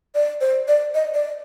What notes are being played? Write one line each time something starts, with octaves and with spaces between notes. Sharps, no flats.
D5
C5
D5
D#5
D5